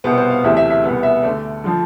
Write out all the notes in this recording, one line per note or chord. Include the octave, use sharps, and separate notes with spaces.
C2 B2 B3 C5
C5
F5
D2 C3 E3 A3 E5
E5
E5
C2 B2 B3
E5
D2 D3 A3 D5
D3 F3